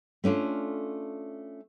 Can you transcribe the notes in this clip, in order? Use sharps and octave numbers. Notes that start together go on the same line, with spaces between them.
A3 C#4 D4 F4